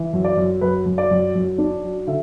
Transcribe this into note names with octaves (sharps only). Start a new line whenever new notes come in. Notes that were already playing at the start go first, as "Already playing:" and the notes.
Already playing: E3
F#2
D5
F#2
F#2 B4
F#2
D5
F#2
F#2
D4
F#3
D3 E5